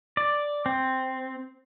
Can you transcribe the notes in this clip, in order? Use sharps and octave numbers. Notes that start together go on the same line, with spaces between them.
D5
C4